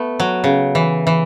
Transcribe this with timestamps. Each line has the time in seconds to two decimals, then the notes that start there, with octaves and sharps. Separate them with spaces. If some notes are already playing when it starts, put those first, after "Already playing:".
Already playing: A3 B3
0.20 F#3
0.44 C#3
0.75 E3
1.07 E3